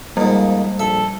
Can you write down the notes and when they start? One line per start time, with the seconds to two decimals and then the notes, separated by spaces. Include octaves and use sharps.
0.17 F2 G#2 G3 A#3
0.79 A#1 A4 E5